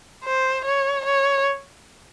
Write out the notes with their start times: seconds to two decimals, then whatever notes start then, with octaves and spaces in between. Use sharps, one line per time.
0.24 C5
0.65 C#5
1.05 C#5